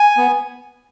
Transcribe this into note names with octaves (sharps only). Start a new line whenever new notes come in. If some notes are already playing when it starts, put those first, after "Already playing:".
Already playing: G#5
B3